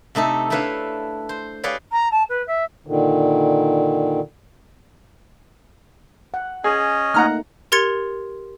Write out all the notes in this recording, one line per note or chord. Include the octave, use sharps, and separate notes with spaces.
C3 A3 D#4 A4
A3 D4 E4 B4 C#5 F5
C5
G4 G#4 B4 C#5 D5 F5
A#5
A5
B4
E5
A#2 D3 D#3
F#5
C#4 G#4 C#5 D#5
A3 A#3 D#4 F#5 A#5 F6
G4 A#4 C6 G#6 A6 C#7